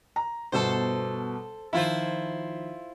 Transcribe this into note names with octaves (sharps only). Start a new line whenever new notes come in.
A#5
G1 B2 A4 C5
D#3 F3 E4 F4 C5